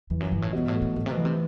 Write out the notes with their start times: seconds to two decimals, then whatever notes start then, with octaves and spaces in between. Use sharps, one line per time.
0.10 E2 E3
0.20 F#2
0.32 G2 E3
0.42 A2
0.53 G2 B2
0.68 A2
0.75 A3
0.82 A2
0.96 A2 A3
1.06 C3
1.11 B2
1.17 E3
1.25 C3